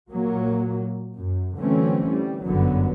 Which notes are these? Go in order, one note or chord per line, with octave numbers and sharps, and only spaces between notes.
A#2 F#3 A#3
F#2
D3 E3 F#3 A3 C4 C#4
G3
G1 F#2 D3 F#3 B3